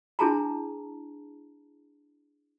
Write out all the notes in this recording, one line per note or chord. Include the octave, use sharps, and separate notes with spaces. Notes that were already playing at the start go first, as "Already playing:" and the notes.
D4 E4 G#4 A5 A#5